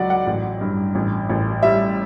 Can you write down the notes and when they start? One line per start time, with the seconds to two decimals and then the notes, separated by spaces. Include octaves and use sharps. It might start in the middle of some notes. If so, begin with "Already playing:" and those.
Already playing: C#2 F#3 D5 F#5
0.10 F#5
0.27 A1
0.61 G2
0.95 A1
1.29 A1
1.63 G3 E5